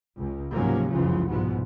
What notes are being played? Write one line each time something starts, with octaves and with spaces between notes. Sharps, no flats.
C#2
G#2 C3 F3 F#3 A#3 C#4
F1 C#2 F#2 C#3 E3 F3
C2 G#2 B2 F3 B3